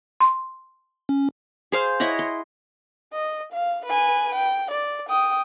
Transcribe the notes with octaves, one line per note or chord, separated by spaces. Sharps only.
C6
C#4
G#4 C5 F5
E4 C#5 D#5 F#5
C6
D#5
F5
B4 G#5
G5
D5
G5 D#6